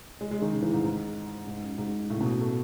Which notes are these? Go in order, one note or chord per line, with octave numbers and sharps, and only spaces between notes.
G#3
G#3
D#3
C#3
E3
G#2
G#2
G#2
F#2
G#2
A2
C#3
B2
A3